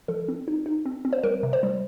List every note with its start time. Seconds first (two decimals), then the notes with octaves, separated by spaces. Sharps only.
0.08 F3 A4
0.28 C4
0.48 D#4
0.66 D#4
0.85 C4
1.05 C4
1.13 C5
1.23 G3 A#4
1.43 C3
1.53 C5
1.63 G3